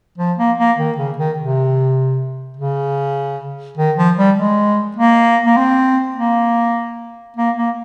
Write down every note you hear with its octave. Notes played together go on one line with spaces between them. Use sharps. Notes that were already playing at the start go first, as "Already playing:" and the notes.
F3
A#3
A#3
D#3
C#3
D#3
C3
C#3
D#3
F3
G3
G#3
A#3
A#3
C4
A#3
A#3
A#3